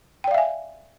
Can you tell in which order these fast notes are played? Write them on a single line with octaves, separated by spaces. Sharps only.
G5 D5 F5 E5 G#5